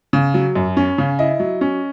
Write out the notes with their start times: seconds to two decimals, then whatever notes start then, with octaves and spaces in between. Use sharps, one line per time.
0.13 C#3
0.34 F#3
0.56 F#2
0.77 C#4
0.98 C#3
1.19 E4 D#5
1.40 F#3
1.61 C#4